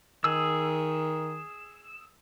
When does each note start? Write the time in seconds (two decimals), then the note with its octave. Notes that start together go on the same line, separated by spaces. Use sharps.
0.24 D#3 G#4 E6